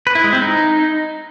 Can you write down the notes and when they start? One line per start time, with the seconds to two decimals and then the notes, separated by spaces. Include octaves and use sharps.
0.07 B4
0.15 E4
0.24 G#3
0.33 C4
0.41 D#4